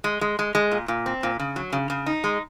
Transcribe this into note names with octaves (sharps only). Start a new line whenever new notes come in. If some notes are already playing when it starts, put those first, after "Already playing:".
G#3
G#3
G#3
G#3
A#2
A#2
C4
A#2
C#3
F#3
C#3
C#3
D#4
G#3